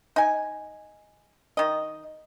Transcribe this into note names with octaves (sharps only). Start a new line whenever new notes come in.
D#4 G#5
D#3 D#5